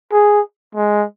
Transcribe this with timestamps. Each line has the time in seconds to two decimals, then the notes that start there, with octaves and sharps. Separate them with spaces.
0.12 G#4
0.76 G#3